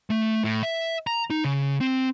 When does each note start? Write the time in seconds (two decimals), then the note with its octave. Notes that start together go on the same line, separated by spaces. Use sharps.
0.10 A3
0.44 A2
0.63 E5
1.07 A#5
1.30 D#4
1.44 C#3
1.81 C4